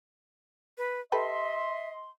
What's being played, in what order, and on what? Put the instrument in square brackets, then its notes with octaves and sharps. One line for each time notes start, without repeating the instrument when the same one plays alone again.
[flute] B4
[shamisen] G4 A4 B4 [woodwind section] D#5 C6 [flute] E5